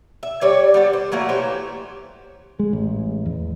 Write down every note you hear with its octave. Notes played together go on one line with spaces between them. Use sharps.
E5
G3 C#5 D5
G3 B3 A4
C5
F#3 A3 A#3 E4
E3 G4 C5 C#5
G#3
A1
E2